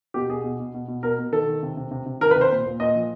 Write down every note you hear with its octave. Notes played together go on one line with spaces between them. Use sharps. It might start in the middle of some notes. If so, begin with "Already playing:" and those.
B2 G4
B2 G#4
B2
B2
B2
B2
B2 A#4
B2
D#3 A4
D#3
C3
C3
C3
C3
D#3 A#4
B4
C3
C5
A#2
A#2
A#2 D#5
F3